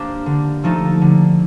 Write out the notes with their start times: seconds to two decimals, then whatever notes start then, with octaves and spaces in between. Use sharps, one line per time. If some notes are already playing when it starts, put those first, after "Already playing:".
Already playing: A#3 D4 G4 C5
0.26 D3
0.64 F3 A3 D#4 A4
1.01 D3